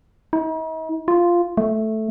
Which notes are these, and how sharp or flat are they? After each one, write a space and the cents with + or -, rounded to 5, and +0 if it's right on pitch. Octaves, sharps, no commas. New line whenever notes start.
D#4 +45
F4 -5
A3 -5